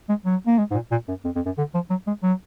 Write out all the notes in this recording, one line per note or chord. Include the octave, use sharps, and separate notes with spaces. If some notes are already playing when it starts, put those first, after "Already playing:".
G#3
F#3
A#3
G#3
G#2
A#2
A#2
F#2
F2
F2
F#2
D3
F3
F#3
G#3
F#3